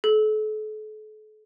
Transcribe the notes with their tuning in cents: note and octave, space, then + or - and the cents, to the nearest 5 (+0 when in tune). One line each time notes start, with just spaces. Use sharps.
A4 -40